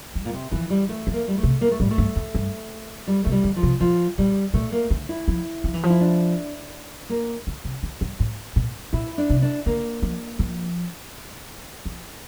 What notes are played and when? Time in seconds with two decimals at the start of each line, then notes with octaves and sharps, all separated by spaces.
0.15 G3
0.25 A#2
0.33 C3
0.51 E3 F3
0.70 G3
0.89 A3
1.07 F3
1.13 A#3
1.28 G3
1.38 A3
1.43 C3
1.61 A#3
1.71 A3
1.80 A2 G3
1.91 A3
1.98 G2
2.16 F2
2.35 G2
3.07 G3
3.24 C3 A3
3.32 G3
3.44 D3
3.56 F3
3.63 C3
3.80 A#2 F3
4.18 A#2 G3
4.54 A#2 A3
4.72 A#3
4.91 D3
5.09 E4
5.28 F3
5.64 F3
5.74 E3
5.83 F3
5.90 E4
6.01 D4
7.09 A#3
7.47 D3
7.65 C3
7.83 D3
8.01 G2
8.20 A2
8.56 A#2
8.93 A#2 E4
9.18 D4
9.30 C3
9.42 D4
9.66 D3 A#3
10.03 F3
10.39 F3
11.86 F3